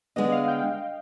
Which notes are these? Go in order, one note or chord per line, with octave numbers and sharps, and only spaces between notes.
D3 G#3 B3 D4 D#5
F5
G5